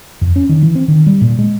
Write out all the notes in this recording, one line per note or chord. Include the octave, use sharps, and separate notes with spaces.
F2
C#4
D#3
E3
C4
D#3
G3
A#2
G#3